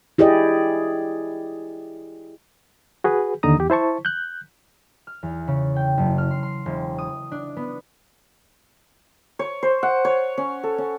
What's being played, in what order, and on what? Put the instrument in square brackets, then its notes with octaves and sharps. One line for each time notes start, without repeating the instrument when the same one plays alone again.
[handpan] E4 G4 G#4 D5 D#5
[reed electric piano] F#4 G#4 B4
D#2 D3 D#4 A#5 D#6
E2 G4
E4 C5 A5 C#6
F#6 G6
[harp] F6
E2
C#3
G5
F#1
F6
C6
C6
E1
D#6
D4
B3
[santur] C#5
C5
F#5
C#5
C#4
A4
C#4